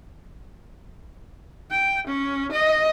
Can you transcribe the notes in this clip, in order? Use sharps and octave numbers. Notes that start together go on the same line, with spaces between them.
G5
C#4
D#5